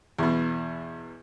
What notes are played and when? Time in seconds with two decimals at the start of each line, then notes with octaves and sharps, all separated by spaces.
0.19 E2 B2